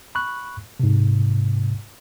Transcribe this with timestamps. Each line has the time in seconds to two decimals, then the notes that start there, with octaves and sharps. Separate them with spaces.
0.15 B5 C#6 F#6
0.80 G#2 C3